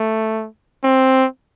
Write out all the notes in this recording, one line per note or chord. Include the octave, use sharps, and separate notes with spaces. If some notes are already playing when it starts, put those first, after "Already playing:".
Already playing: A3
C4